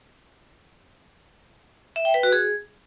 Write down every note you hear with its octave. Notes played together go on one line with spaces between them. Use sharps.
E5
G5
B4
F#4
G#4